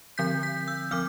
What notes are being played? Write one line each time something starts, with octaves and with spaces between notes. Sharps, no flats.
D3 F3 C4 G6 B6
G6 B6
E6 G6
F3 C4 D6 F6